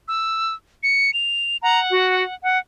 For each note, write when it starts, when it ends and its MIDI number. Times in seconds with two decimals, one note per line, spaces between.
0.08 0.54 88
0.83 1.13 97
1.13 1.57 101
1.63 2.35 78
1.63 1.80 82
1.91 2.23 66
2.43 2.58 78